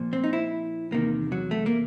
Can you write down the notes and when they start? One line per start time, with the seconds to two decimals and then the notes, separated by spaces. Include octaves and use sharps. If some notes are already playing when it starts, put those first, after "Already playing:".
Already playing: A#2 F3
0.13 C4
0.24 D#4
0.33 E4
0.91 E2 C3 D#3 A#3
1.32 F#3
1.51 A3
1.66 A#3